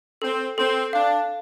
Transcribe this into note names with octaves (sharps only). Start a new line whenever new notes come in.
C4 A4
C4 A4
D4 F5